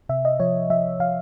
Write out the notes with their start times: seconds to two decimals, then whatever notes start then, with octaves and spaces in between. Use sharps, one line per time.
0.09 C3 E5
0.25 D#5
0.40 F3 C#5
0.70 F3 E5
1.00 F3 F5